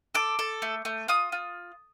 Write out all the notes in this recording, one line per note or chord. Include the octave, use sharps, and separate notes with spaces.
A4 D6
A4
A3
A3
F4 D#6
F4